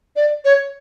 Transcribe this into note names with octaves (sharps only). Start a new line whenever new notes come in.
D5
C#5